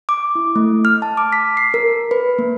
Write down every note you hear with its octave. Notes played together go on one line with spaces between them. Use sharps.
D6
E4
A3
F6
A5
D6
B6
C7
A#4
B4
A#3